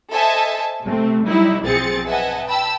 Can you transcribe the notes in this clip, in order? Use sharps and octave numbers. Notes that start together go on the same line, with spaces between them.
A4 C5 D#5 E5 G#5 A5
C3 A3 C4
F#3 G3 D#4 E4
B1 F3 C4 G#4 A6 C#7
B4 D#5 E5 F#5 G#5 A5
G5 A5 B5 E6